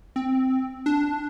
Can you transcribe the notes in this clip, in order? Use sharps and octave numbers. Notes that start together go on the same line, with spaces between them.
C4
D4